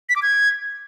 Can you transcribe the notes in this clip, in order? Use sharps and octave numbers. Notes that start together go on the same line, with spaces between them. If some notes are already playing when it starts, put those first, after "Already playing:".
B6
D6
G#6